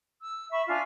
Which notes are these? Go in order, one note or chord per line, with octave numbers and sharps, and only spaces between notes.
E6
E5 B5 C#6
D4 F4 G#5